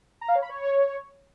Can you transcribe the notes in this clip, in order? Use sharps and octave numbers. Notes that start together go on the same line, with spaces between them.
A#5
F5
C#5
B5
C#5